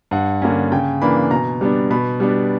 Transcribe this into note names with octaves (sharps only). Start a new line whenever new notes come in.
G2 F#5
D3 A#3 C#4
C#3 G5
E3 A#3 D4 B5
B2 A#5
G3 B3 D4
B2 B5
G3 B3 D4